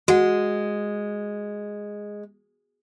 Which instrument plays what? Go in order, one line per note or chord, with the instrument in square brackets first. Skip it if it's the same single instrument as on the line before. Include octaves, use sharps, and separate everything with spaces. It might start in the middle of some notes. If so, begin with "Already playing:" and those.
[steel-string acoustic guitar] G#3 [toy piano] F#4 F#5